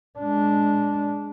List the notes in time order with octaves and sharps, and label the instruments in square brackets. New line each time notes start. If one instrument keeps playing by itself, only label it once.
[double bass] G#3 D4